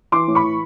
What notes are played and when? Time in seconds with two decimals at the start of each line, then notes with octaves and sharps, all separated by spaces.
0.12 E3 C6 D6
0.28 A2
0.35 B5 C#6
0.43 E3